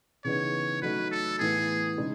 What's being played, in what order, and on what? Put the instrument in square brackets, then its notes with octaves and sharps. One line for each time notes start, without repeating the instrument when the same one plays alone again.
[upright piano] C#3 E3 B3 D#4 [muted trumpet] C#5
[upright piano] F#3 A3 D#4 [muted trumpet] B4
[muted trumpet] A4
[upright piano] A2 E3 B3 E4 [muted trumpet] G#4
[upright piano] C#3 G#3 D#4